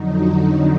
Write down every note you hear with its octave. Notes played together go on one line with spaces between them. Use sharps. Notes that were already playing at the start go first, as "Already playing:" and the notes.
Already playing: F2 D3 F#3 D#4